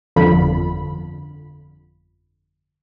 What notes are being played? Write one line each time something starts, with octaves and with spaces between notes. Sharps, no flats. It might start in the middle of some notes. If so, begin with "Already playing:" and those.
G1 F2 D3 F4 B5